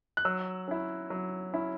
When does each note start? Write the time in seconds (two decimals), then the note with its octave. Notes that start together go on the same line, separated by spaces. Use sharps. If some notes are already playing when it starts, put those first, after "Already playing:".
0.17 F#6
0.25 F#3 E6
0.68 C#4 E4
1.10 F#3
1.54 C#4 E4